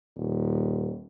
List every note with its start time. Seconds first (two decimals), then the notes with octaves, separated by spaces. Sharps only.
0.16 D#1